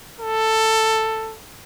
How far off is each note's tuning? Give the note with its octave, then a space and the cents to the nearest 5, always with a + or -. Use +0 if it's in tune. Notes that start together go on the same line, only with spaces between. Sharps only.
A4 +10